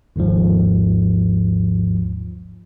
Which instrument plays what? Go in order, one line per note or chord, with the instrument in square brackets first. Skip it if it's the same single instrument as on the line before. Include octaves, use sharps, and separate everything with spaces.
[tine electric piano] G#1 D#2 G#2 F3